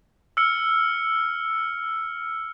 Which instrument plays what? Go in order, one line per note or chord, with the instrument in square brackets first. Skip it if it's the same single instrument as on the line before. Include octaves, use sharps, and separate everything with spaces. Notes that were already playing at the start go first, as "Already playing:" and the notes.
[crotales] E6 F6 C#7